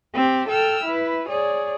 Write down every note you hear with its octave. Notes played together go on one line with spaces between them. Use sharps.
C4 G4
A4 G5 E6 F6
E4 B4
G#4 C#5 D5